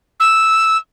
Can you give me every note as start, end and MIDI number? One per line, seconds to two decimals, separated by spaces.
0.19 0.77 88